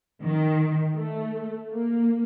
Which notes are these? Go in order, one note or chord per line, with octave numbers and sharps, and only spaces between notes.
D#3
A3
A#3